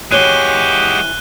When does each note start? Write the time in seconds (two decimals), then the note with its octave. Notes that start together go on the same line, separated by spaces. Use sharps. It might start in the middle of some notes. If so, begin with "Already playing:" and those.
0.11 E3 G#3 F#4 G4 C#5 F#6 D#7 G7